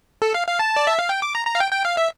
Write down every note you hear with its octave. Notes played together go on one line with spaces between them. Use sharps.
A4
F5
F5
A5
D5
E5
F5
G5
D6
A#5
A#5
F5
G5
G5
F5
E5